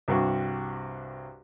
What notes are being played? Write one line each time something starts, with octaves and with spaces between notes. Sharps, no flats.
C2 G2 F#4